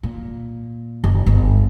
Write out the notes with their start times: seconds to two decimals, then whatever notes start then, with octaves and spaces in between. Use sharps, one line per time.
0.03 A#2
1.04 F#1 D#3
1.26 G1